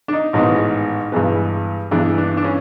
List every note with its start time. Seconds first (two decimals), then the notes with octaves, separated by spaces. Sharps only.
0.08 D4
0.13 D#4
0.33 A1 G#2 D#3 G#3 B3
1.12 G2 E3 G#3 B3
1.91 G2 E3 G#3 B3 D4
2.18 D4
2.37 D4
2.44 C#4